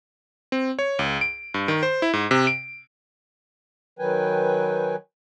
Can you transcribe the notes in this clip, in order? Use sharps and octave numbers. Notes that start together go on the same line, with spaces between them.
C4
C#5
C#2
D7
G2
D#3
C5
E4
G#2
C3
D7
D#3 F#3 B4 G5 G#5